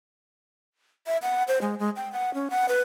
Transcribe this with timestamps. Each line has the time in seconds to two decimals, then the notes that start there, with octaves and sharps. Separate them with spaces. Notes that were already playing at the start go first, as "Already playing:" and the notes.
1.07 E5
1.22 F#5
1.48 C5
1.62 G#3
1.79 G#3
1.96 G5
2.13 F#5
2.34 C#4
2.50 F#5
2.69 B4